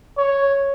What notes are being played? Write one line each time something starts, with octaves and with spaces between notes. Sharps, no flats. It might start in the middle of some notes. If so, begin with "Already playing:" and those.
C#5